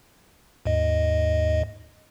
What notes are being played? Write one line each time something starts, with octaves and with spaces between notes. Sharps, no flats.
D#2 G#2 D#5